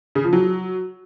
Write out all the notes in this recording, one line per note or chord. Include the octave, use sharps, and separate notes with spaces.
C#3
F3
F#3